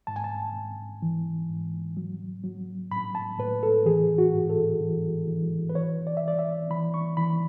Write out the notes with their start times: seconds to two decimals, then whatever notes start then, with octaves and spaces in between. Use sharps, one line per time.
0.07 G#2 A5
0.16 G#5
0.24 A5
0.55 G#2
1.02 E3
1.49 G#2
1.97 F#3
2.44 F#3
2.91 A2 B5
3.15 A5
3.39 A2 B4
3.63 A4
3.86 E3 G#4
4.18 F#4
4.34 G#2
4.50 A4
4.81 E3
5.28 E3
5.69 B4
5.75 E3 C#5
6.07 D5
6.17 E5
6.23 E3 D5
6.39 E5
6.70 E3 B5
6.94 C#6
7.17 E3 B5